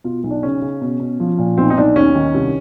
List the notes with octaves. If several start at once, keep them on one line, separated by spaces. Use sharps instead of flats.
B2 F4
B1
D4
C#3 C#4
C#3
B2
B2
F3
A#2
B1 C4
D#4
B1 D4
D#2 C#4
D#3
C2